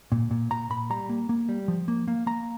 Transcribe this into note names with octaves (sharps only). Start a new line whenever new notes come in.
A#2
A#2
A#2 A#5
A#2 B5
G3 A#5
A#3
A#3
G3
F3
A#3
A#3
A#3 A#5